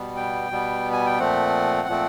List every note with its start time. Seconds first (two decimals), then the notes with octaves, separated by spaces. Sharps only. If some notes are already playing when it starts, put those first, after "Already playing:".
Already playing: B2 G3 B3
0.17 G5
0.50 B2 G3 B3
0.93 G#5
1.06 G5
1.19 A#2 F3 A3 C4 F#5
1.88 A#2 F3 A3 C4